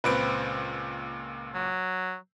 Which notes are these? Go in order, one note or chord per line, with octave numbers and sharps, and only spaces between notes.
C#2 A#2 C4 B4 D7
F#3